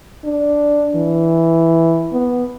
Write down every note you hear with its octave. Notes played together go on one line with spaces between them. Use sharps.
D4
E3
B3